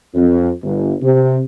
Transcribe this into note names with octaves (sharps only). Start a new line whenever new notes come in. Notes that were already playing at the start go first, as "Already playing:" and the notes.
F2
G1
C3